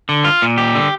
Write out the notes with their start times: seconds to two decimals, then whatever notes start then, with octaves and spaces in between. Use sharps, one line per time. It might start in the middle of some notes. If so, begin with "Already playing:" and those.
0.09 D3
0.25 F4
0.42 A#2
0.58 G4
0.75 D3